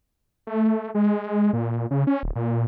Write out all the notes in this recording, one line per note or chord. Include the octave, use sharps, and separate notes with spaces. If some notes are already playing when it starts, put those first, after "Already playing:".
A3
G#3
A#2
C#3
C#4
D1
A#2